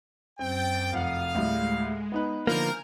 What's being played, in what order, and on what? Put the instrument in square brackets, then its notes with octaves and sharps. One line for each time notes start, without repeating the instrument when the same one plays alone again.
[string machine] F#2 A6 [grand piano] C4 [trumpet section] G5
[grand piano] F1 F#5 [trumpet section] F5 [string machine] D#6
[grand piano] D2 A2 G3 [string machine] G#3
[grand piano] B3 D#4 B4
[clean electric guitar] D3 F3 A#3 [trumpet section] A#4 [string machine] G#5 F6 G6